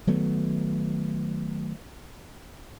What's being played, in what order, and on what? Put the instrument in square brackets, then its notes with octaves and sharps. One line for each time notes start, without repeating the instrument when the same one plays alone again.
[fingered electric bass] D#3 F#3 A3 B3